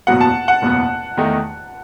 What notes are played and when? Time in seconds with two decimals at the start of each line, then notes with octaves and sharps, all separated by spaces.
0.07 F#1 E2 B2 F#3 B3 F#5
0.21 A5
0.48 F#5
0.62 F#1 E2 B2 F#3 B3
1.17 E2 D#3 A3 D#4